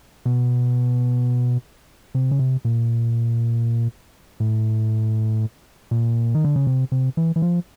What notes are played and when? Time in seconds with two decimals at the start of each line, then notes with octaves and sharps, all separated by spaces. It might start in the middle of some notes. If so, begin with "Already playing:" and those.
0.26 B2
2.15 C3
2.31 C#3
2.39 C3
2.65 A#2
4.40 A2
5.91 A#2
6.34 D#3
6.44 D3
6.56 C#3
6.67 C3
6.92 C3
7.17 E3
7.36 E3
7.42 F3